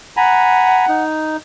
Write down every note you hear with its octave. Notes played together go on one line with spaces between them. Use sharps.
F#5 G#5 A#5 B5
D#4